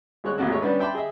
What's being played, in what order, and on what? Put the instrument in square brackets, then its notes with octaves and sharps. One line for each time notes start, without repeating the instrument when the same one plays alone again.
[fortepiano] C2 G#3 C#5 F#6
A1 D#2 C3 F#4 A4
G#1 G#3 A3 C#5
G3 B3 C#4 D4 B4
E5 G5 A5 B5 C6 D6
G4 G#4 D#5 E5